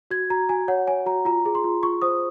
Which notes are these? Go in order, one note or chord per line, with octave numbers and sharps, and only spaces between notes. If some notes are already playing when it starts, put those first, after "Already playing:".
F#4 G#6
F#4 A#5
F#4 G#5
C#5 F#5
C#5 G#5
F#4 A#5
F4 A#5
G#4
C6
F4
F4 C#6
C5 D#6